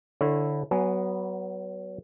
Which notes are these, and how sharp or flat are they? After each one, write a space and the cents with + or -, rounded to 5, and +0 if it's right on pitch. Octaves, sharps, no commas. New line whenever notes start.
D3 +0 E4 +0 C#5 -25
F#3 +25 B3 +0 G#5 +0